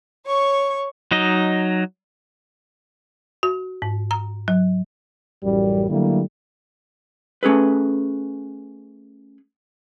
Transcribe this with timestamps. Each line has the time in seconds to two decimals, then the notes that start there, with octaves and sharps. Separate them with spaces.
0.24 C#5 C#6
1.11 F#3 D#4 D#5
3.43 F#4
3.82 G#2
4.11 A#5
4.48 F#3
5.44 A1 F#2 G3
5.90 D3 F#3 G3 A3 A#3 E4
7.43 A3 C#4 G#4 A4 B4